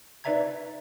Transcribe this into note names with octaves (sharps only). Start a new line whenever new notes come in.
D#4 B4 D5 E5 A#5 G#6